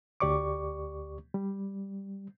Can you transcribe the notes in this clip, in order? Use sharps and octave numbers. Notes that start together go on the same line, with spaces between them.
D2 G4 D5 C#6 D6
G3